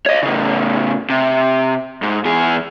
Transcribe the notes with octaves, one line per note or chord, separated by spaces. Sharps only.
C#5 D#5
A2 C#3
C3
G#2
E2 G#4